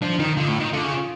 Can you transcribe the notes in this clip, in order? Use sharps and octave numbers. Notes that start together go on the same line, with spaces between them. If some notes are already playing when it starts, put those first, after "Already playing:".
F3 D4
D4
D#3 D#4
D3 F4
A2
D#3
D3 F4
C#3
F4